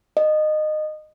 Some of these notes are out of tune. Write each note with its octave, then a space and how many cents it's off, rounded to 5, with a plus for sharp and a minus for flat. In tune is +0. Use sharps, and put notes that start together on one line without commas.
D#5 -20